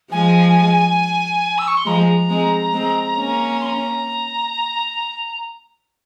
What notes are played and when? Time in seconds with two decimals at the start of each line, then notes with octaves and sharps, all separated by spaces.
0.11 F3 G#3 G#5
1.58 E6
1.67 C#6
1.77 C6
1.86 F3 G#3 A#5
2.29 G#3 C4
2.73 G#3 C4
3.16 A#3 C#4
3.60 C6
3.65 A#5